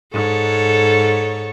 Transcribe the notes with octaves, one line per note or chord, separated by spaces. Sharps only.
G#2 A4 C#5